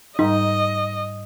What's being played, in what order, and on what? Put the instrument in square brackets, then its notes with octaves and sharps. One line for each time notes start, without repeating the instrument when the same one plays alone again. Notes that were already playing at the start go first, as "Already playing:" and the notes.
[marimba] G#2 G3 [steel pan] D#4 [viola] D#5